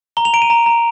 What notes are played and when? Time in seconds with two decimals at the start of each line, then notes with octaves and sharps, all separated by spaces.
0.17 A#5 G7
0.25 F7
0.34 A#5 D7
0.42 D#7
0.50 A#5
0.66 A#5